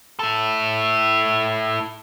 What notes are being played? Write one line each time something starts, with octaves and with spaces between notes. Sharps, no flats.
E4 A4